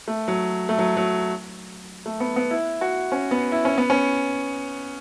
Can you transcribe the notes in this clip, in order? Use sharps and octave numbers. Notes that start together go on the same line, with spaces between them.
A3
F#3
A3
F#3
F#3
A3
B3
B3
E4
F#4
C#4
B3
E4
C#4
B3
C#4